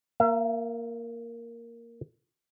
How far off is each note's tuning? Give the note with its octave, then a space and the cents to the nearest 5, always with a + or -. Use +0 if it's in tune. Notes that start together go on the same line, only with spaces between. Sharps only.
A#3 +0 E5 +40